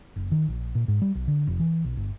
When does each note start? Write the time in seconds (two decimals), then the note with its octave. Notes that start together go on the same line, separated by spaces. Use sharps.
0.16 F#1
0.32 D#3
0.48 A#1
0.75 A#2
0.88 G#2
1.02 G3
1.15 B1
1.28 D3
1.47 F1
1.60 E3
1.84 B1
1.97 G1